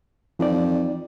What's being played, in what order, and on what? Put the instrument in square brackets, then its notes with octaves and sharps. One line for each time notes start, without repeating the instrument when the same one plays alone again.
[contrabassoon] F2 [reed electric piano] E3 D#4 D5